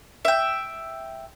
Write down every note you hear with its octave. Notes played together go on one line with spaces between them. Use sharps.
E5 G5